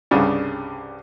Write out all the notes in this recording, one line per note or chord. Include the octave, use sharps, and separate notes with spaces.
C2 G2 C#3 D4